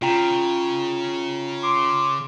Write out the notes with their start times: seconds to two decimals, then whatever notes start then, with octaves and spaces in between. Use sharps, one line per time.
0.02 C#3 F4 G5 A#5
1.63 C6 D6